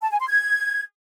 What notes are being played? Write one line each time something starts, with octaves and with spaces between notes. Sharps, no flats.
A5
G#5
C6
G#6